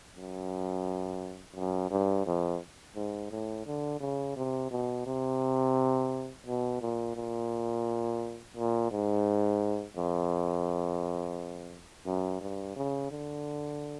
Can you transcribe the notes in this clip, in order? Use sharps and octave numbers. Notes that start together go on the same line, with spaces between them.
F#2
F#2
G2
F2
G#2
A2
D3
C#3
C3
B2
C3
B2
A#2
A#2
A#2
G#2
F2
F#2
G2
C#3
D3